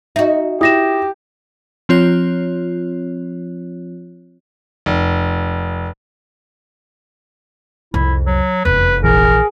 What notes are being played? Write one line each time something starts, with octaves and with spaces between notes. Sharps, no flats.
D#4 F#4 E5
E4 G4 D#6 A#6 E7
F3 C4 F4 C#5 F#6
F1
C2 F2 E4
F#3
F1 E2 B4
A#1 E3 G#4 A#4